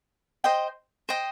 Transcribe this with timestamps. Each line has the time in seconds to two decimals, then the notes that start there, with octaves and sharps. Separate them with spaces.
0.44 C5 D#5 G5
1.09 C5 D#5 G5